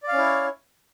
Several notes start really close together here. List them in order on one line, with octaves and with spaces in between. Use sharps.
D5 F5 C#4 E4 C#5